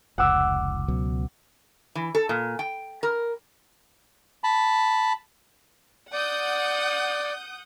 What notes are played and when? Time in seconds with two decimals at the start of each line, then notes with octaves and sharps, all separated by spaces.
0.18 F1 C#2 F#5 D6 E6
0.88 C#2 B2 F#3
1.95 E3
2.15 A4
2.29 A#2
2.59 G5
3.03 A#4
4.44 A5 B5
6.13 D5 F#5 D#6 G6